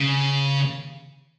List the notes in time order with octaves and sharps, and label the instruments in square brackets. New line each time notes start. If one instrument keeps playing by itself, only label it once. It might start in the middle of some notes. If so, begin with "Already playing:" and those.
Already playing: [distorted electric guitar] C#3